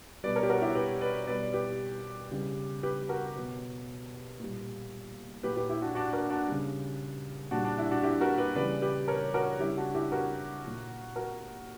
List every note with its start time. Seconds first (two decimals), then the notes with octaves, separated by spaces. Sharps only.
0.24 B2 G3 B4 D5
0.36 A#4 C#5
0.43 G4
0.49 F#4 A#4
0.62 E4 G4
0.75 G4 B4
1.01 B4 D5
1.27 B2 G3 B4 D5
1.53 G4 B4
2.31 C#3 G3
2.83 G4 B4
3.09 F#4 A#4
3.36 B2 F#3
4.40 A#2 G3
5.43 A#2 F#3 G4 B4
5.56 G4 B4
5.69 E4 G4
5.82 D4 F#4
5.95 D4 F#4
6.13 F#4 A#4
6.30 D4 F#4
6.48 C#3 G3
7.51 A#2 G3 D4 F#4
7.65 D4
7.78 E4
7.91 D4 F#4
8.03 E4 G4
8.21 F#4 A#4
8.38 G4 B4
8.55 C#3 E3 G3 B4 D5
8.82 G4 B4
9.08 A#4 C#5
9.34 F#4 A#4
9.59 C#3 G3 E4 G4
9.77 D4 F#4
9.95 E4 G4
10.12 F#4 A#4
10.64 A#2 F#3
11.16 F#4 A#4